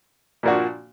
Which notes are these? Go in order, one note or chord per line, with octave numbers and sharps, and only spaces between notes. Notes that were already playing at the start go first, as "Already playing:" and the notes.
A#2 F3 A#3 D4 F#4